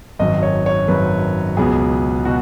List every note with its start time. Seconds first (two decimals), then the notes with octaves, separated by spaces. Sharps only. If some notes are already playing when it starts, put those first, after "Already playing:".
0.19 G#1 F#2 D#3 D#5
0.43 C#5
0.66 C#5
0.88 G#1 F#2 D#3 B4
1.57 C#2 B2 F#3 B3 G#4
2.25 B2 F#4